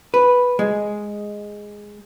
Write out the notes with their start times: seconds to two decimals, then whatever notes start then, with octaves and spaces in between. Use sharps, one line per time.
0.14 B4
0.59 G#3